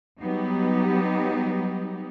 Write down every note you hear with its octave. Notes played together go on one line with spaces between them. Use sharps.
F#3 G3 B3 D#4 G4